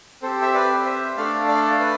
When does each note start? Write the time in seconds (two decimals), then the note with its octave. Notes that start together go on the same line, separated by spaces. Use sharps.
0.22 C4 G4 A4 C5
0.42 E5
0.54 B4 D5
0.85 C5 E5
1.17 A3 D4 A4 D5 F5
1.48 D5 F5
1.80 B4 D5